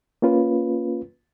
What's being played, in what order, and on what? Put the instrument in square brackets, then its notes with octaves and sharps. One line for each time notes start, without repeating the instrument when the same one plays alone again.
[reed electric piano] A#3 C#4 F4 B4